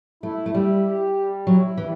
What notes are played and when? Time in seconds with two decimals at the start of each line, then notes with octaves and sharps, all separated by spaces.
0.23 A3 E4
0.46 A3
0.54 G3 E4
0.85 G4
1.16 G3
1.47 F#3 E4
1.77 E3 G3